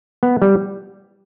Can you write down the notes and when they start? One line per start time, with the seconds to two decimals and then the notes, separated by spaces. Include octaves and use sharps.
0.23 B3
0.42 G3